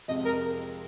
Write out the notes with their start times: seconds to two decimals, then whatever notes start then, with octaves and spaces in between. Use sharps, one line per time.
0.08 F2 C3 G#3 F4 D#5
0.25 A#4